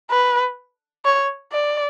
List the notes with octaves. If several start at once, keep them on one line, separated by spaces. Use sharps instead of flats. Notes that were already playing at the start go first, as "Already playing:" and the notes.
B4
C#5
D5